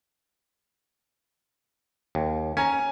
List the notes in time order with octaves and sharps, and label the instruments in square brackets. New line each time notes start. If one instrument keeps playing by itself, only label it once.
[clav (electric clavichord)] D#2
[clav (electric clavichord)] C#4 [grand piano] G#5 A#5